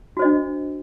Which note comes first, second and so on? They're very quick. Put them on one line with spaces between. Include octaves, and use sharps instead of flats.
F#4 C5 D#5 D4